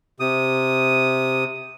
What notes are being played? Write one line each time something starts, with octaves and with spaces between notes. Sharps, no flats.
C3 D#6